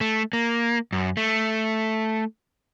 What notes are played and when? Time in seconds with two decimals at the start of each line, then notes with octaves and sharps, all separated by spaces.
0.01 A3
0.33 A#3
0.92 F#2
1.17 A3